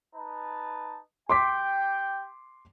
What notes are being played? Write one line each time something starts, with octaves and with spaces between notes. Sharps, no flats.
D#4 B4 A5
G4 G5 C6 D6 B6